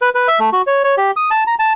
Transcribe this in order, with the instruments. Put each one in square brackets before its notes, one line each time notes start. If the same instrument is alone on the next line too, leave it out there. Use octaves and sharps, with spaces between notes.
[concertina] B4
B4
E5
A3
F#4
C#5
C#5
G4
D#6
A5
A#5
A5